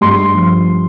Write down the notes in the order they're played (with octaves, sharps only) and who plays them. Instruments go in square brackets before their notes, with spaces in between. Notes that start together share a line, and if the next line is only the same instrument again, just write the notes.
[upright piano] G2 C6
F3